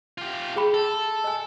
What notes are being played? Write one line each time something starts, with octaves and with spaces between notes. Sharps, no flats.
F4 G4
G#4 G5 B5
A4
D#5 G#5